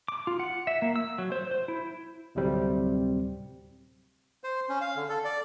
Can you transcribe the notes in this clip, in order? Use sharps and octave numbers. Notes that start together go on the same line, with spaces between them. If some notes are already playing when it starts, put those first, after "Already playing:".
D6
F4
F#5
E5
A#3
E6
F#3
C5
C5
E4
D2 A2 C3 F#3 G3 C4
C5
C#4
F5
D3
A4
D5